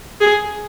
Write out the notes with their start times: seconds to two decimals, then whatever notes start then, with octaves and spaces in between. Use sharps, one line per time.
0.21 G#4